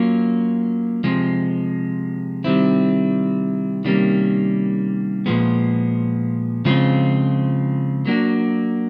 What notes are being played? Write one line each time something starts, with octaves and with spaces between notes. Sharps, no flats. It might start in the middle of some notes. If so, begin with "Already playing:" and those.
Already playing: F#3 A#3 C#4 F4
C3 F3 G#3
C3 D#3 G3 C4 E4
C3 D#3 G3 A#3 C#4
A#2 F3 G#3 B3
C#3 F3 G#3 C4 F4
F#3 A#3 D4 F#4